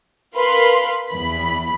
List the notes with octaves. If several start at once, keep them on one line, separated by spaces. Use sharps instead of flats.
A#4 B4 F5 B5 C6
E2 B5